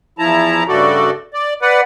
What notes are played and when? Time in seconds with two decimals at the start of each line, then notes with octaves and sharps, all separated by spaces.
0.19 E2 F3 E4 A5 A#5
0.68 G2 C#3 A3 F#4 A4 D5
1.34 D5
1.62 B4 D5 F#5